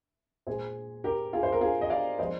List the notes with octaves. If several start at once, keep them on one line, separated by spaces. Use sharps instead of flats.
A#2 G#3 G#4 C5
G4 A#4
F4 G#4
C5
A#4
F4 G#4
D#5
D5 F5
F3 G#3 C5 D#5